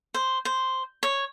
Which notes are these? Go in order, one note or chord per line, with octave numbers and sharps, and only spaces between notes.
C5
C5
C#5